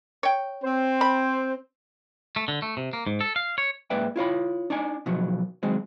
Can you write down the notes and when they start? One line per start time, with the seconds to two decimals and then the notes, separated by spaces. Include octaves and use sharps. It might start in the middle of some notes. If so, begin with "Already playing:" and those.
0.23 C#5 G5
0.63 C4 C5
1.01 B5
2.36 A3
2.48 D3
2.62 A3
2.77 C3
2.93 A#3
3.07 G#2
3.21 A4
3.36 F5
3.58 C#5
3.90 G#2 A#3 B4 D5 E5 G5
4.16 E4 F4 C#5 B5
4.70 D4 D#4 D5 G#5
5.06 B2 D#3 F3 F#3
5.63 D#3 F#3 G#3 C4